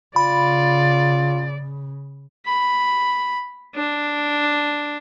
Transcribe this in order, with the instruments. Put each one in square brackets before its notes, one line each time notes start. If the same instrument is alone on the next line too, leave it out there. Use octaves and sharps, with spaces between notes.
[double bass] C#3 [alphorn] F4 [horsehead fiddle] D5 [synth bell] B5
[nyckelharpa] B5
D4